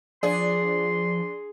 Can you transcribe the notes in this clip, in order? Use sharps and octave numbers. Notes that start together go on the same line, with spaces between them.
F3 D4 G#4 C6